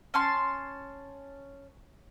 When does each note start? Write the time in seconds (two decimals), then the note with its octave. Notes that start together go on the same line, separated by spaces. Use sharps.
0.14 C#4 A5 C6